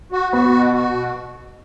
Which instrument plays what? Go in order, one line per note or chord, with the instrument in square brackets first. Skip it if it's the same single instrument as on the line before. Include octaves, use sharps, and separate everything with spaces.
[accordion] F#4
[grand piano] B3 [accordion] F#4
[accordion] B2
F#4
B2